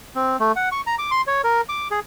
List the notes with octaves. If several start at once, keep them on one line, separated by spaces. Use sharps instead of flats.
C4
A3
F#5
C#6
A#5
D6
C6
C#5
A#4
D6
G#4